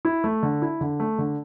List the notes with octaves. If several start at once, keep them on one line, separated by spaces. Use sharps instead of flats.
E4
A3
D3
E4
D3
A3
D3